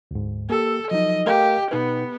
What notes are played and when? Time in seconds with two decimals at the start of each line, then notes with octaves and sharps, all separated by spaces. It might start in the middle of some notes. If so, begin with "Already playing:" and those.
0.11 D2 G#2
0.50 A#3 G4 A4 E6
0.91 F3 F#3 D#4 D#5
1.26 A3 G4 A#4 F5
1.71 B2 B3 D#4 B4